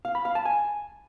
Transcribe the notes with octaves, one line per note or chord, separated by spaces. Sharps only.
F5
B5
F5
A5
G#5